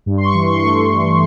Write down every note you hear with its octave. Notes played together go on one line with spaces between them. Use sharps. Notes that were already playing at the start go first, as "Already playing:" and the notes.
G2
C6
C#6
E3
C#6
C6
A3 C#6
G2